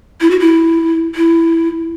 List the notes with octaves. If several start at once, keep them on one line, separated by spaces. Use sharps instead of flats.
E4
F#4
E4
E4